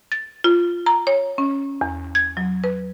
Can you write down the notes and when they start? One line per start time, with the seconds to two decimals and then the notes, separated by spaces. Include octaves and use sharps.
0.12 A6
0.44 F4
0.86 A#5
1.07 C#5
1.38 C#4
1.81 E2
2.15 G#6
2.37 F#3
2.64 B4